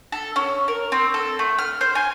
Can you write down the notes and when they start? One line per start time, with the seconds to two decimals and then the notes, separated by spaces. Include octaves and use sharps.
0.12 A4
0.36 C#4
0.68 A#4
0.92 C4
1.14 A4
1.39 A3
1.58 F6
1.81 C5
1.95 G#5